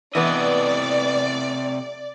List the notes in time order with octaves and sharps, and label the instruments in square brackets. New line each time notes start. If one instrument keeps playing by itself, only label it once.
[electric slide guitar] C3 A3 D#5 [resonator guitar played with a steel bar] E3 B3 [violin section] D5